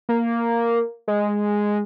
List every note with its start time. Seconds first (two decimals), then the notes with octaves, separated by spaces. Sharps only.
0.09 A#3
1.08 G#3